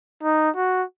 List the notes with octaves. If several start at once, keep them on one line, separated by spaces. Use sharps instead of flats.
D#4
F#4